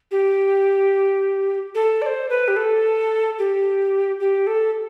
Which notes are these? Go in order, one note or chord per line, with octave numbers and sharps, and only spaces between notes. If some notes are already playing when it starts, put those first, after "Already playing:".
G4
A4
D5
C5
B4
G4
A4
G4
G4
A4